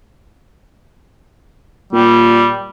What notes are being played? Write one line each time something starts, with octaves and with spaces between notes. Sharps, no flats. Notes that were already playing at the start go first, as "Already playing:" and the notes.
A#2 G3